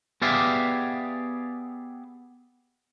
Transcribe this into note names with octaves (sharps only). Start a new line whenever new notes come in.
B3 G4 G#4 D5 E5 F5